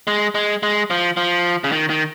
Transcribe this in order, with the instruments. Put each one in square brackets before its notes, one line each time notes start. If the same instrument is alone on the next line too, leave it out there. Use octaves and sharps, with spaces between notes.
[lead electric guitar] G#3
G#3
G#3
F3
F3
C#3
D#3
D#3